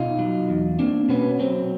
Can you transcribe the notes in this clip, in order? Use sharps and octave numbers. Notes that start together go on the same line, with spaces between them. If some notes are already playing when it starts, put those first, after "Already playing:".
Already playing: B2 D#4 F4
F#3
E2
A#3 C4 D4
B2 B3 C#4
F#3 C4